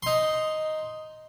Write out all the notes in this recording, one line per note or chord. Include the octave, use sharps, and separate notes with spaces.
D#4 C6